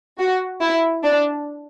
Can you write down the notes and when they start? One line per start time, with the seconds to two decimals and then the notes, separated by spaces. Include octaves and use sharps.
0.18 F#4
0.61 E4
1.03 D4